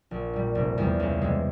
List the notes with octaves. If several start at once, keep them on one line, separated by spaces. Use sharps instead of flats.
A#1
A#2 G3
F1
E2 C3 G3
C#2
C3 E3 G#3